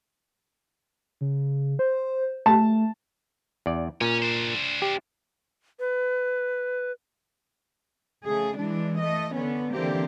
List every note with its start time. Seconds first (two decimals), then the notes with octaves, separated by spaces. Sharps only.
1.21 C#3
1.79 C5
2.46 A3 A5
3.66 E2 D5
4.01 A#2 C#4
4.22 D4 C5
4.82 G4
5.80 B4
8.26 C#3 A3 G#4
8.58 E3 G#3 D4
9.00 A3 D#5
9.33 D3 B3 C#4
9.73 D3 E3 A#3 C4 G4